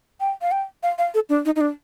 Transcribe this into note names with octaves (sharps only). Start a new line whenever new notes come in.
G5
F5
G5
F5
F5
A4
D4
D#4
D#4
D4